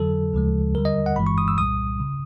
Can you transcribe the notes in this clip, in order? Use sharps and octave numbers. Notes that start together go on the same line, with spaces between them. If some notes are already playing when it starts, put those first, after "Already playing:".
Already playing: F2 D3 F#3 A4
D2 C#3 F3 G#3
D#2 D3 G3 A#4
D#5
F#5
G1 G2 E3 G#3 B5
C#6
D#6
E6
C2 A#2 G3 D#6
C#3